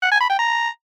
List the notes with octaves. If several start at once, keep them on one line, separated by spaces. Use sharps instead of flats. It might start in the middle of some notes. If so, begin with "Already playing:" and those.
F#5
G#5
B5
G5
A#5